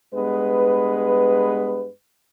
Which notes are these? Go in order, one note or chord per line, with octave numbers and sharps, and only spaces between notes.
G2 G#3 B3 B4